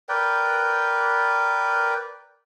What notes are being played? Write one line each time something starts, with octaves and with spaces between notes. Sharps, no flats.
A#4 B4 D5 G5